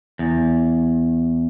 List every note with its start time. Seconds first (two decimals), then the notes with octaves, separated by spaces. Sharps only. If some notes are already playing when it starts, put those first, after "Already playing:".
0.19 E2